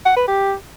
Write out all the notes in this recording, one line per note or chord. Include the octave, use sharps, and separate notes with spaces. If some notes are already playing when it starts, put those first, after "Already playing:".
F#5
B4
G4